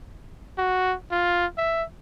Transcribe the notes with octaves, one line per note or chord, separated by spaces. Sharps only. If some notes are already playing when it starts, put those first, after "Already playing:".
F#4
F4
E5